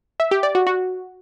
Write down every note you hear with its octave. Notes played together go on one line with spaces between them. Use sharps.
E5
G4
D5
F#4
F#4